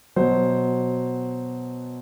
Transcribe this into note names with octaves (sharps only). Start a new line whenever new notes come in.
B2 F#3 C5